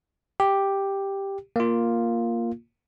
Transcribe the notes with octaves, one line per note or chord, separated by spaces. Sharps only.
G4
A#3 F4